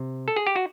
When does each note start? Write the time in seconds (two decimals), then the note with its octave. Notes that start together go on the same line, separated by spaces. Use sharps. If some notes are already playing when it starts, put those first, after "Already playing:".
Already playing: C3
0.28 A4
0.36 G#4
0.47 G4
0.56 F#4